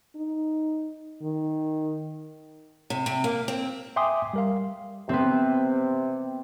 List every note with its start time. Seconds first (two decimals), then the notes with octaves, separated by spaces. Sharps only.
0.16 D#4
1.22 D#3
2.90 C3
3.06 C3
3.24 A#3
3.48 C4
3.96 E5 G5 G#5 C6 D6 D#6
4.33 G3 A#4 F5
5.09 C3 B3 C4